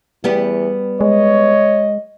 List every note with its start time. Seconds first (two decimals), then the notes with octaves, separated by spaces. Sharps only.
0.24 E2 G3 B3 G4
1.01 G#3 C#5 D#5